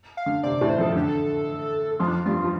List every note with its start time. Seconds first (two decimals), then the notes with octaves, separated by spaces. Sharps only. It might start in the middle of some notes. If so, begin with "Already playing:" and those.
0.17 F5
0.26 D3
0.43 C3 C4 D5
0.61 A2 A3
0.70 C5
0.78 F2 F3 A4
0.92 D3 G4
1.03 A4
1.99 F2 F3 F4
2.08 D4
2.15 F4
2.25 G2 G3 F4
2.44 F3